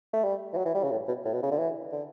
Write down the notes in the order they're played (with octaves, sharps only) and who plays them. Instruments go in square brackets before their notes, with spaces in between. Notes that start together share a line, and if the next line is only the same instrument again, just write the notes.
[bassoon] A3
G3
E3
F#3
E3
G3
C#3
A2
B2
A2
B2
C#3
D3
E3
D3